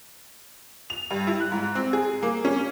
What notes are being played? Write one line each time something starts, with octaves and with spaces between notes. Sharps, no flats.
F7
G2
E4
F#6
G#2
C4
G#4
A#3
C#4